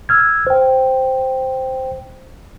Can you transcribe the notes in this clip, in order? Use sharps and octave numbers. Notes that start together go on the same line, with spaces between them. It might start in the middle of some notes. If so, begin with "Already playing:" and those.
E6 F6 G#6
C5 G5